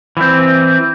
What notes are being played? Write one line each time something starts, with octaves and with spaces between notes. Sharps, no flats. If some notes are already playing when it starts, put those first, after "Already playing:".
E3 C4